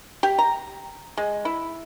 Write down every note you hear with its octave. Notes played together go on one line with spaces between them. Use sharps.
G4
A#5
G#3
E4